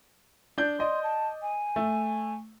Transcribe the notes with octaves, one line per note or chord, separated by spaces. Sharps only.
D4 G6
D5 D#5 C6
A5
G#5
A3